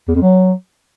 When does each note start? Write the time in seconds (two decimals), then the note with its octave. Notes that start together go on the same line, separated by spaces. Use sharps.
0.08 E2
0.15 F2
0.22 F#3